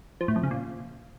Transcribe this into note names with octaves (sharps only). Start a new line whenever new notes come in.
F3
A2
F2
C#3
A#2